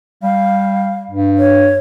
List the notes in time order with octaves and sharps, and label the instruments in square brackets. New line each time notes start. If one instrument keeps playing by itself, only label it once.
[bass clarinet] G3 [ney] F5
[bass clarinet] G2
[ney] C#5